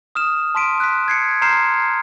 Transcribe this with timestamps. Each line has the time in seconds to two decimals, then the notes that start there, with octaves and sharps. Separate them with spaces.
0.15 D#6 F6 E7
0.55 A5 C6 B6 D7 D#7
0.80 F#6 B6
1.08 G#6 C7 C#7
1.42 A#5 C6 F6 G6 C7 E7